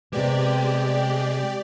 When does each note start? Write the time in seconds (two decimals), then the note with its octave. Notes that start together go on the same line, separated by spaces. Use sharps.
0.13 C3 G#3 B3 G4 D5